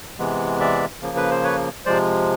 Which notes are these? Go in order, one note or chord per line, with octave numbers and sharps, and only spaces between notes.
C3 E3 G#3 B3
D5 E5
C#3 F3 A#3
B4
C5
B4 C#5
C3 F3 G#3 C5 D5